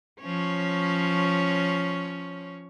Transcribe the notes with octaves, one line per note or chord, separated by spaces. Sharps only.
F3 C#4 C#5